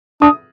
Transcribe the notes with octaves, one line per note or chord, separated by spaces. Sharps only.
D4 D#6